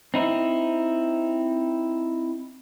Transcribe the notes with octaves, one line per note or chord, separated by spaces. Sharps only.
C4 D#4 E4